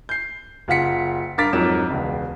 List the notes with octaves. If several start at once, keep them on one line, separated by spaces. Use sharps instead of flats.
G6 C7
F#1 F4 F5 F#5 B6 C#7
G2 A#4 F5 D6 A6 B6
F2 G#2 F#3 A#4 D6 E7
E1 C#2